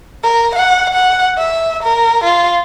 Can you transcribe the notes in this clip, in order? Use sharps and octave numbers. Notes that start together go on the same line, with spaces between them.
A#4
F#5
F#5
E5
A#4
F4